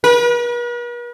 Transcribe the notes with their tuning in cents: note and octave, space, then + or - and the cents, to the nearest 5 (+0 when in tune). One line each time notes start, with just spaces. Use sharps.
B4 -45